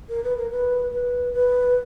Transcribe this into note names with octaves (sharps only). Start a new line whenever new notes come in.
A#4
B4
A#4
B4
B4
B4